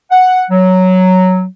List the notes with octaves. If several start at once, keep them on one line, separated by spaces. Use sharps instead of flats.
F#5
F#3